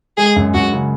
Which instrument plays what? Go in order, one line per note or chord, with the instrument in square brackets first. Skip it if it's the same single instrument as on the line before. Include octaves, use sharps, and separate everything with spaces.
[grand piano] G#3 [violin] G#4
[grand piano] F#2
[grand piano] F#2 [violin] F#4
[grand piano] C#3